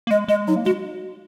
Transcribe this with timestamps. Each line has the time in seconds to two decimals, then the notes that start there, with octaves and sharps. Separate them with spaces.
0.07 A#3
0.11 G#3 D#5
0.28 G#3 D#5
0.48 F#3 D#4
0.56 A#3
0.65 G#3 F#4